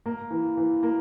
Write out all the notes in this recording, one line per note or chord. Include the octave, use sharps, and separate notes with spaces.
A#3
E3
E3
A#3